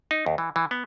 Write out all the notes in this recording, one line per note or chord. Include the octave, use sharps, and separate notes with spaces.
D#4
D#2
E3
E3
B3